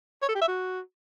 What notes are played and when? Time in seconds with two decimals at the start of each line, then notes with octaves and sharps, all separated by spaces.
0.22 C#5
0.29 A4
0.35 G4
0.42 E5
0.48 F#4